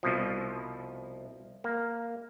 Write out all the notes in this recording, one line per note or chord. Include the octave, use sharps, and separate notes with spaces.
C2 B2 F3
A#3